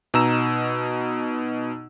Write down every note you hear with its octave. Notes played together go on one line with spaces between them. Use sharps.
B2 D#4 A#5 E6 E7